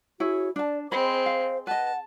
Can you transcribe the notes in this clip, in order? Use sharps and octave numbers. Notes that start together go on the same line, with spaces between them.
E4 F#4 G#4 C#5
D4 D5 A5
G#3 C4 C5 B5
F5
B4 D#5 F#5 A5